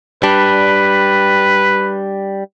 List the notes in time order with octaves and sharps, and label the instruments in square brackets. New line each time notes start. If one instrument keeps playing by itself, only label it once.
[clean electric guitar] G3 D4 [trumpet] B4